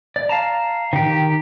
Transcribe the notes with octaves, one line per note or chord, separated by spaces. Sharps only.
D5
F5 A5 A#5
D#3 G4